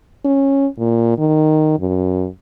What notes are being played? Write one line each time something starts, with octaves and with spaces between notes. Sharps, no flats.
C#4
A#2
D#3
F#2